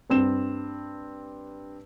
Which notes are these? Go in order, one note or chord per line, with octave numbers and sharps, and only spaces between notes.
G2 C4 E7